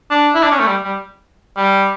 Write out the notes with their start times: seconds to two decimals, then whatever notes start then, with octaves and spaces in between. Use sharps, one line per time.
0.11 D4
0.35 E4
0.43 D4
0.52 C#4
0.60 A3
0.67 G3
0.84 G3
1.57 G3